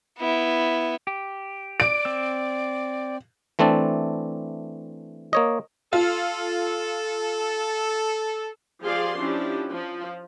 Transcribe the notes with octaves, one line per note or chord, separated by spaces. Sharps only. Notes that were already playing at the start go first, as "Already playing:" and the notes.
B3 E4
G4
D5 D7
C4 E6
E3 A3 C4 D4 D5
A#3 C#5 D#5
F4 A4
F3 G4 G#4 D5 F5 C6
F3 C#4 D4 E4 G4
F3